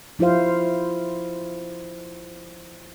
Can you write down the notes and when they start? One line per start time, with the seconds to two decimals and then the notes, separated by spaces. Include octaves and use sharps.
0.19 F3 E4 F4 C5 F5